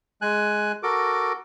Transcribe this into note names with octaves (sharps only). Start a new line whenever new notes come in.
G#3 G#5 F#6
F#4 A4 A#4 D6